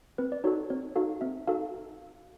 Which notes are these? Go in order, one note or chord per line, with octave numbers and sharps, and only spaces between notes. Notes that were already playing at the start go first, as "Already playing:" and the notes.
C4 B4
D5
D#4 F#4 A4 C#5
C4 C#5
D#4 F#4 A4 F5
C4 E5
D#4 F#4 A4 F5